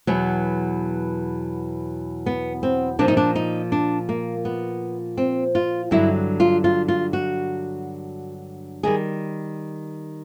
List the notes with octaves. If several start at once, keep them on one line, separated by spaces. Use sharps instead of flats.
E2 B2 F#3 B3
B3
C4
A#2 F3 D4
D#4
D4
D#4
D4
A#3
B3
C4
F4
G2 D3 F#3 E4
F4
F4
F4
F#4
D#3 G3 G#4